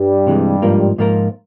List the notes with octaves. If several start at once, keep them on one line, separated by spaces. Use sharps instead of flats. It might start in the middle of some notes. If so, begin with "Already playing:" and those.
Already playing: G2 G3
C3 E3 G#3
G#2 F3 A#3 F4 A#4
G#2 F3 A#3 F4 A#4